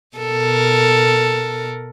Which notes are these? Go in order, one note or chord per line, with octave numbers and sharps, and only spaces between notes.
B2 A4 A#4